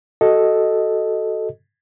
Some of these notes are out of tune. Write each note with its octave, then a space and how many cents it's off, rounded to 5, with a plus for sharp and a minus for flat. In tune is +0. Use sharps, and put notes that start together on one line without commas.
F#4 +20 A4 +0 D#5 +0